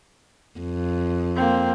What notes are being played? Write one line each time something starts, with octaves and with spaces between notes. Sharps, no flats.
F2
A#3 C4